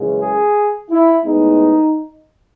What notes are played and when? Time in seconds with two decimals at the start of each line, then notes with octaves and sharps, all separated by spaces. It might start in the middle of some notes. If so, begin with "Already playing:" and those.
Already playing: F#2 C#3 E3 G#3
0.20 G#4
0.90 E4
1.25 A2 G#3 B3 D#4